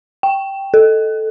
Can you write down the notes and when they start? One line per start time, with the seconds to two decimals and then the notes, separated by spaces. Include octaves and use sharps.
0.23 G5
0.74 A4